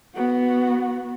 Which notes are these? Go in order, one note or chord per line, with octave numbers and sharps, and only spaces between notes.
B3 F#4